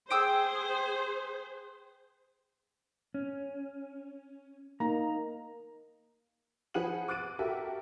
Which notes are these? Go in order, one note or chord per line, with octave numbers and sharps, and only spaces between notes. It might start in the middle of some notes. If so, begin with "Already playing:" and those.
G#4 C5 G5 D#6 E6
C#4
A#3 D#4 A#5
F3 G#4 B4 F#5 D#7 F#7
D6 F#6 A6 D7 D#7
F#4 G4 A4 A#4 E5